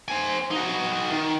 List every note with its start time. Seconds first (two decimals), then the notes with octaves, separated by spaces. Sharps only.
0.08 C5 G#5
0.51 D#4 F#4
1.11 D#3